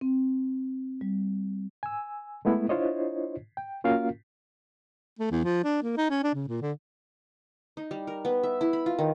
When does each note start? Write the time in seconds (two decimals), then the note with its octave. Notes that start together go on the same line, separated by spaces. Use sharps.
0.01 C4
1.01 G3
1.83 G#5 E6
2.45 G#3 A3 B3 E4
2.69 D4 E4 F4 C5 C#5 D#5
3.57 G5
3.84 A#3 C#4 F4 F#4 A#4 F5
5.19 A3
5.31 E2
5.44 F3
5.64 D4
5.82 A#3
5.97 D#4
6.10 C#4
6.23 D4
6.34 C#3
6.48 A#2
6.61 D3
7.77 D#4
7.91 G3
8.07 A#4
8.25 B3
8.43 E5
8.61 E4
8.73 B5
8.86 F4
8.99 D#3